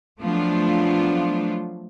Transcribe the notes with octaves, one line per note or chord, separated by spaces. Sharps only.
F3 F#3 A3 B3 D4 F4